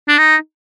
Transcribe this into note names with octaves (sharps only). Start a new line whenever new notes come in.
D4
D#4